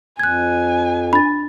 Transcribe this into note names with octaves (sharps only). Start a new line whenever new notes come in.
F2 G#5 F#6 G#6
D4 B5 A6